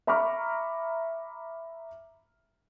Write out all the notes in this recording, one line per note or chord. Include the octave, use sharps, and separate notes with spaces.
E5 A#5 B5 C#6 D6 F6